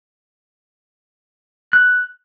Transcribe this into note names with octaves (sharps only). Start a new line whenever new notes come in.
F#6